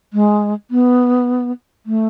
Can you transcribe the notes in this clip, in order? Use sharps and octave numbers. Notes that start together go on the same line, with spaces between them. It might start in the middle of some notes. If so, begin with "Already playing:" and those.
G#3
B3
A3